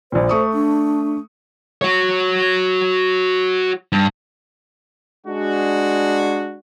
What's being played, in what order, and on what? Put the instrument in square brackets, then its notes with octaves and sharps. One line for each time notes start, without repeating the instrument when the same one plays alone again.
[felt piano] A#1 A#2 [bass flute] C5
[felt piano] A3 C#6 D#6
[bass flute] D4
[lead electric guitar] F#4 C#5
G2
[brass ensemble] G#3 D4 F#4